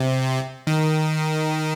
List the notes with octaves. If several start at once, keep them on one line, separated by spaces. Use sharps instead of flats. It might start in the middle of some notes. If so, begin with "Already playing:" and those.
Already playing: C3
D#3